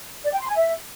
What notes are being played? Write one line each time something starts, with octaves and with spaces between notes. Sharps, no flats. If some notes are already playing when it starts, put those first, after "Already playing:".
D5
G5
C6
G#5
E5